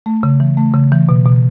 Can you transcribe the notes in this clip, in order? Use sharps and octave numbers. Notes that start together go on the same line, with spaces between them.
A3
C#3
E3
A3
C#3
E3
B2
B2